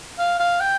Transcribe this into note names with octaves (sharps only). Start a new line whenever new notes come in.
F5
F5
G5